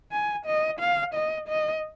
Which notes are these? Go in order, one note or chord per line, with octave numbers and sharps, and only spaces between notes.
G#5
D#5
F5
D#5
D#5